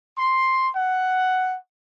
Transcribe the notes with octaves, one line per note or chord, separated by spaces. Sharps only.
C6
F#5